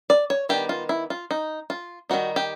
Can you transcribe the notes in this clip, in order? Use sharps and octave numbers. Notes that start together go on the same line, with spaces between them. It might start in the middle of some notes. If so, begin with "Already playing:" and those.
D5
C#5
D#3 G3 B3 D4 G4
F4
E4
F4
D#4
F4
D#3 G3 C4 D#4 F#4
G4